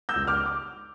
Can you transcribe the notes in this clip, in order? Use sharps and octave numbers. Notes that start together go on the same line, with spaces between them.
E6 G6
C#2
D6 F6
D6